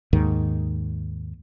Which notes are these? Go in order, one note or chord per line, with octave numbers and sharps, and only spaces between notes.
D#2 G#2 D#3